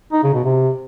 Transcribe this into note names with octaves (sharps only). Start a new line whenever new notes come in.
D#4
C#3
B2
C3